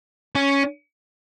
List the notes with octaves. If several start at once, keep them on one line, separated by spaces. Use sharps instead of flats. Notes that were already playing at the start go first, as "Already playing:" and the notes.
C#4